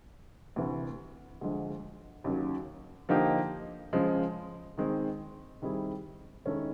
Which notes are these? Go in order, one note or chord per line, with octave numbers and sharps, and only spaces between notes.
D2 C3 E3
D2 D3 F3 G#3
D#2 C#3 F#3
D3 F3 A#3 D#4 G4
C#3 F3 G#3
D#3 G#3 C4
D#3 G3 C4 E4 G#4
D#3 G#3 C#4 E4 A4